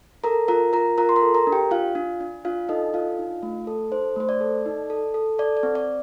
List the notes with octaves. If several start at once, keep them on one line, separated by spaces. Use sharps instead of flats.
A4 A#4 A#5
F4 A#4 A#5
F4 A#4 A#5
F4 A#4 A#5
C6
A#4 A#5
A4
A#4 A#5
D4
G4 G5
D4 F4 F5
D4
D4
D4 F4 F5
D#4 A4 D#5
D4 F4 F5
D#4
A3
A4
D#4 C5
A3 C5
D5
A4
D#4
A4
A4
A4 D5
D5
C4
D5